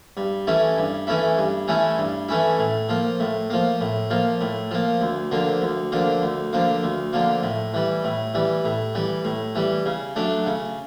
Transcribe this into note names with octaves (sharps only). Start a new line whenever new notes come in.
G2
E3 A3 C#4 E4
G2
E3 A3 C#4 E4
G2
E3 A3 C#4 E4
G2
E3 A3 C#4 E4
A2
F3 A#3
A2
F3 A#3
A2
F3 A#3
A2
F3 A#3
D2
D3 F3 A#3
D2
D3 F3 A#3
D2
D3 F3 A#3
D2
D3 F3 A#3
A2
E3 G3
A2
E3 G3
A2
E3 G3
A2
E3 G3
C#3
F#3 A3 D4
C#3